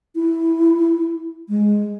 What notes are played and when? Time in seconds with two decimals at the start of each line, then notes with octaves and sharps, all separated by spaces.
0.15 E4
1.49 G#3